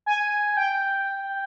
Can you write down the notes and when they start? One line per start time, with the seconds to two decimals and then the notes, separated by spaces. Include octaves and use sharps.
0.06 G#5
0.57 G5